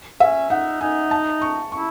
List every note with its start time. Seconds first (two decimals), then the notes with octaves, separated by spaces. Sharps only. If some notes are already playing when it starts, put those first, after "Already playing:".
0.20 C#4 E5
0.50 D#4 F#5
0.81 D#4 G#5
1.11 A5
1.42 C#6
1.72 E4 C#6